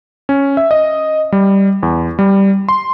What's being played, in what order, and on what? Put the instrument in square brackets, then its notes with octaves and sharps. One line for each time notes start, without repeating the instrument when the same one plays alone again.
[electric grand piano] C#4
E5
D#5
G3
E2
G3
C6